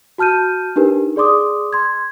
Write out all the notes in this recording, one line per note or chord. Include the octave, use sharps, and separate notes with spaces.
F#4 A5 F6 G6 D#7
D4 D#4 G4 A#4 B4
G#4 D5 C6 D6 D#6
C6 G#6